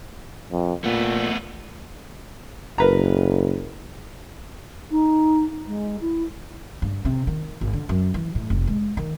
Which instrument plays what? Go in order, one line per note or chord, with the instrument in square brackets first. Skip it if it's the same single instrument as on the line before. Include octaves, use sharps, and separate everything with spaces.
[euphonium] F2
[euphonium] A#2 [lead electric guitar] A3 B3
[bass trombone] F#1 [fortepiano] A#4 B4 A#5
[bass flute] D#4
G#3
E4
[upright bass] G2
C3
D#3
G#1
D3
F#2
E3
A2
F1
G#3
D#3